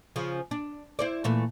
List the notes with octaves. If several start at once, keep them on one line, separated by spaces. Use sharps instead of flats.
C#3 F3
D4
E4 C5 D5
A#2 E3 A3